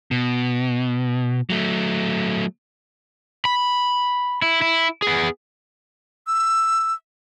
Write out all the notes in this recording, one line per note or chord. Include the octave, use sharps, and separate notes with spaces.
B2
F#3 A3
B5
E4
E4
B3 G#4
E6